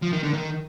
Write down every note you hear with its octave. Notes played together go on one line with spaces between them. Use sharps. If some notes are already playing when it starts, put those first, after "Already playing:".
F3
D#3
D3
D#3